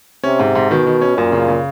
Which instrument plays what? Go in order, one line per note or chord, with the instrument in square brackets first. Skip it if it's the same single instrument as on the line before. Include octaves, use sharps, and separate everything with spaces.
[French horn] C3 [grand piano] C#4
[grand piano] G#2
G#2
[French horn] B2 [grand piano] D#3
[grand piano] D#3
C#4
[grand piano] F#2 [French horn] A#2
[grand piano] C#3
C#3